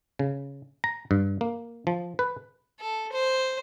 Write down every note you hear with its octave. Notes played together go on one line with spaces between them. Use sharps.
C#3
A#5
G2
A#3
F3
B4
A4
C5